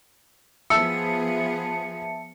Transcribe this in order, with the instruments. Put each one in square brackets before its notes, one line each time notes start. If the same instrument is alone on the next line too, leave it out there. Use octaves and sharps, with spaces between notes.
[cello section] F3 B3 G#4 [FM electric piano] E5 A5 [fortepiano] E6 [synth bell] C#7